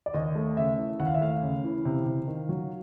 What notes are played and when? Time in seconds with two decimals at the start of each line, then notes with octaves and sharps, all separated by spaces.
0.06 D5
0.14 D#2 D#5
0.35 A3
0.57 C#3 E5
0.78 E3
1.00 D#2 F#5
1.07 F5
1.14 E5
1.21 A3 F5
1.43 C#3
1.64 E3
1.85 C3
2.06 C3
2.28 D#3
2.49 F#3